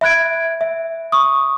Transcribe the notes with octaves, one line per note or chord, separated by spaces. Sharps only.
E5 B5 F#6 G#6 D7
E5
C#6 D#6